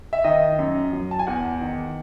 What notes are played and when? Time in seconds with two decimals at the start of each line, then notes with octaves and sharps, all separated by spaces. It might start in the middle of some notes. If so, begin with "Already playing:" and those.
0.13 E5
0.24 D#3 D#5
0.59 F#2
0.93 F#3
1.11 A5
1.19 G#5
1.27 E2 F#5
1.61 D#3